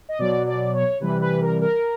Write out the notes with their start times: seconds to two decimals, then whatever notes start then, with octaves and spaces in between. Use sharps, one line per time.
0.09 D#5
0.19 B2 F#3 D5
0.46 D5
0.74 C#5
1.00 C3 E3 G3 B4
1.22 B4
1.41 A#4
1.61 A#4